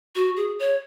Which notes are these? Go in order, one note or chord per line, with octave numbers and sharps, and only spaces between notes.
F#4
G#4
C#5